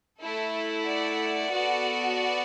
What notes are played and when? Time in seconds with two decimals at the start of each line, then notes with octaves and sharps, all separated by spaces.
0.21 A3 E4 A4
0.84 D5 F#5
1.48 B3 F#4 A4
2.11 D5 F#5